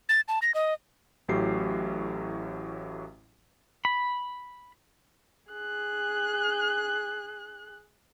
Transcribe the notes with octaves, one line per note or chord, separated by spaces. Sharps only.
A6
A5
A#6
D#5
A1 A2 F#3 G4 C7
B5
G#4 F#6